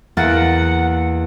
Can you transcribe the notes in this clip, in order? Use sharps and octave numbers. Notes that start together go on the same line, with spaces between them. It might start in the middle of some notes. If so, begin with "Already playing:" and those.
E2 A#3 F#5 A6